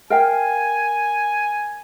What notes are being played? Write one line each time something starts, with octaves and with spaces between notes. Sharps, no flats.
A#4 F5 G5 G#5